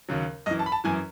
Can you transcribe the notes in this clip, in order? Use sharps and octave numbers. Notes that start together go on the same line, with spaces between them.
D#2 C#3 F#3
F#2 E3 D#5
A5
B5
A5
F#2 E3 G#5